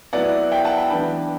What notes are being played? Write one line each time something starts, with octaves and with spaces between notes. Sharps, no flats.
F#3 B3 E4 D5 F#5
E5 G5
F#5 A5
G5 B5
E3 B3 D4 G5 B5